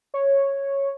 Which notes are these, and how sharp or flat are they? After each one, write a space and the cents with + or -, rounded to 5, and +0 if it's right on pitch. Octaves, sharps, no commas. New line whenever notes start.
C#5 -5